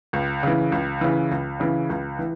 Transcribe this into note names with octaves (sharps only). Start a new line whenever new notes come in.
C#2
C#3 E3
C#2
C#3 E3
C#2
C#3 E3
C#2
E3